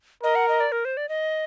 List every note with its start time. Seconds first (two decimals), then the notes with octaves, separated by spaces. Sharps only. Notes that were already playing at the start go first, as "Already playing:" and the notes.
0.23 A#4 D#5
0.35 F#5
0.48 D#5
0.60 D5
0.72 A#4
0.85 C5
0.97 D5
1.09 D#5